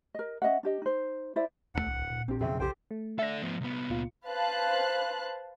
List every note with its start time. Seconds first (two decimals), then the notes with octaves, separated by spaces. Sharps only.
0.15 A#4 D#5
0.42 C#4 D#5 E5 F#5
0.63 D4 G4 D#5
0.82 D#4 C5
1.36 E4 C5 D5 E5
1.75 E1 D#2 C#3 A3 F#5
1.86 D1 C2
2.11 A#2
2.28 A#1 C4 D4 G4
2.41 B1 F2 C#3 C4 G#4 E5
2.60 B1 G4 A4 C5 G5
2.91 A3
3.19 A4 D5 E5 A#6
3.42 F3 B3
3.61 C2 B3
3.89 C#2 A#2 F4
4.26 B4 C5 F5 A5 F#6